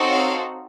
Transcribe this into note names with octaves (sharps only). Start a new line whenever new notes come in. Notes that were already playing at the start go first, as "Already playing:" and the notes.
Already playing: C4 D#4 F#4 A4
C#5 F5